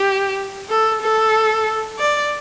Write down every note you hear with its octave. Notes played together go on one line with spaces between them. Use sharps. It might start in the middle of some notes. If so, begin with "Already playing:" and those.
Already playing: G4
A4
A4
D5